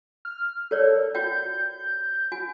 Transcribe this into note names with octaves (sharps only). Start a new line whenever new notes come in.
F6
A4 A#4 C#5 D5
F#4 G5 G6
F#4 G#5